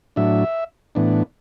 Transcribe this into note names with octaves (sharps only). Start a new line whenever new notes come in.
A2 F#3 D4 E5
A2 E3 B3 D4